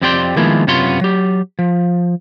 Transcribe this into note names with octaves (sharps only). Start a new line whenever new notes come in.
F2 C4 G4 D5 G5 C6
D#3 F3 G#3 A#3 B3 E4
F#2 C3 B3 F4 C#5 C6
F#3 G4
F3